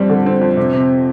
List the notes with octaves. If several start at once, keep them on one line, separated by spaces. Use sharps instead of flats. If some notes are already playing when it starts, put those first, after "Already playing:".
Already playing: F2 G3 C4
D3
C4
F2
C3
C3